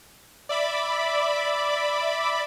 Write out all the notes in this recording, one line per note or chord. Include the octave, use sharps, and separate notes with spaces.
D5 E5 B5 D6